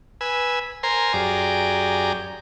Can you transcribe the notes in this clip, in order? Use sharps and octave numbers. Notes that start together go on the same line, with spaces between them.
B4 G#5 E6
A#4 C5 G#5 A#5 C6
F#2 G4 G#4 D5 A#5